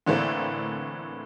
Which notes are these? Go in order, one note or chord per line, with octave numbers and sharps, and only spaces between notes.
A2 D3 E3 A3 A#3 C4